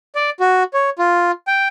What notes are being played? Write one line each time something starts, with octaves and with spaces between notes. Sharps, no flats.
D5
F#4
C#5
F4
G5